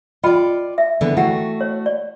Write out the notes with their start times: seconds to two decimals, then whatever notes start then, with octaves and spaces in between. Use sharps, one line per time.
0.23 F4 D5 D#5 G5 B5
0.78 E5
1.01 D3 E3 B3
1.17 A3 E4 F#4 F#5 G5
1.61 C#5
1.86 D5